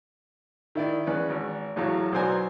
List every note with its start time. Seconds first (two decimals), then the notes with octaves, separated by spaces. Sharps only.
0.75 D#3 E4 D5
1.06 E2 C#4 B4 D5
1.30 G#1
1.76 A1 E2 A2 F#3 F5
2.12 B1 F#3 B3 C5 D5 G#5